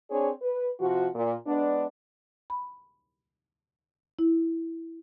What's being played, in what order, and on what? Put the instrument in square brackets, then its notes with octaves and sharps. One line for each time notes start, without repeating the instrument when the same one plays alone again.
[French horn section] C4 D4 G#4 C#5
B4
C3 F3 F#4
A#2
G#3 B3 D4
[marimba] B5
E4